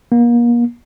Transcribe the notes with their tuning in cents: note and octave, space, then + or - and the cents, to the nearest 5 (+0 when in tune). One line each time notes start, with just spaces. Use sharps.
A#3 +35